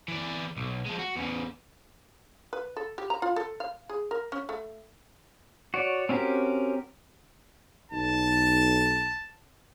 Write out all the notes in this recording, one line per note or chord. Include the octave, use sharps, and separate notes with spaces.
E3 D5
B1
F3 G#3
F#4
E2 C#3
B4
A4
G4
A#5
F4
A4
F5
G#4
A#4
C#4
A3
F#4 C#5 D5
C4 C#4 F#4 G4 A#4
B1 D#4 A5